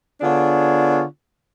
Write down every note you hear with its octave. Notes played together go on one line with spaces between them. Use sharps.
D3 B3 D4 F4 G#4 C#5